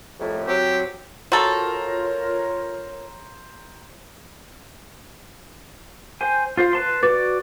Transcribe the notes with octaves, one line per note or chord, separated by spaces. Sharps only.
C2 F2 A2
F#3 C4 G4
F4 F#4 A4 A#4 C5 C#5 A#5
C5 G5 G#5
F4 C5 A6
B4 A5 C6
F#4 B4 D5 D6 A6